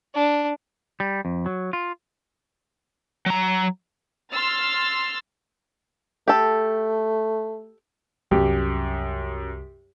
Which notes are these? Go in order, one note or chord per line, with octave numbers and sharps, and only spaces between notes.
D4
G3
F2
F#3
F4
F#3 A#5
C6 E6 F6 A6
A3 G4 A4
C2 F#2 G4